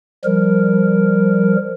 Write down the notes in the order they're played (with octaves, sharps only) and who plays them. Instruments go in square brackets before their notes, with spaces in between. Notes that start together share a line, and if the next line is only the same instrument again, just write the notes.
[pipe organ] F3 G3 A#4